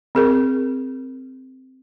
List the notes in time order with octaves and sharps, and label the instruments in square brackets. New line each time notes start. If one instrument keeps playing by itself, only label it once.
[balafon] C4 G#4 A#4